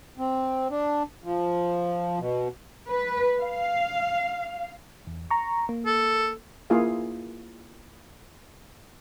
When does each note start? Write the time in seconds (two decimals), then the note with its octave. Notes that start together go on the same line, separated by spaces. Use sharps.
0.18 C4
0.70 D4
1.24 F3
2.19 B2
2.89 B4
3.43 F5
5.07 E2
5.30 A#5 C#6
5.69 A#3
5.86 A4
6.70 A#3 E4 F4 G#4 F5